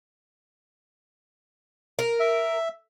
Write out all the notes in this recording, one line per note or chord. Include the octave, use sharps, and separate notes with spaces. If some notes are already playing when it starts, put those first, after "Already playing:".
A#4
E5